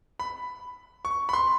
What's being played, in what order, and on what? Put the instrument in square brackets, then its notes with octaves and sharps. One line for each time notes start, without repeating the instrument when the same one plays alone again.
[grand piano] B5
C#6
B5
C6